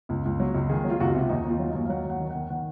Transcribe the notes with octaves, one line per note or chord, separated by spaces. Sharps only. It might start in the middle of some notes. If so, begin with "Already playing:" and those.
C#2
C#2
F#3
C#2
D#3 G#4
F#3
F4
C#2 F#4
C3 F4
D#2 D#4
D#2 F4
F#3
D#5
D#2
F5
F#3 F#5
D#2 F#5
D#3
D#3 F#5
D#3 F#5